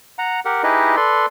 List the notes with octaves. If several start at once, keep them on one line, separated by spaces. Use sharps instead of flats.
F#5 A#5
G4 A#4 F#5
D#4 E4 G4 G#4 B4 D#5
A4 B4 D5 C6